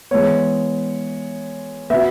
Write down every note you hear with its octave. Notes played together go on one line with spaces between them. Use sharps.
E3 G#3 B3 C#5
B2 B3 E5